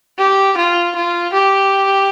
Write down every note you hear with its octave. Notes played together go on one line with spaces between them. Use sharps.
G4
F4
F4
G4